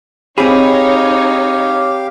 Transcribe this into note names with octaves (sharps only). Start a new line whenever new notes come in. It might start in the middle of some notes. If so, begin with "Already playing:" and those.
C4 D#4 G4 G#4 C#5 F5 B5